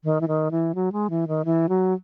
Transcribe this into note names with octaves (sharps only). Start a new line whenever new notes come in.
D#3
E3
D#3
E3
F#3
G#3
E3
D#3
E3
F#3